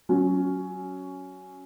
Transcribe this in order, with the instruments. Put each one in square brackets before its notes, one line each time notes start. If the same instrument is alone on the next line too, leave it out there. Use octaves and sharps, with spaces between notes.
[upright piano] F#3 C#4 F#4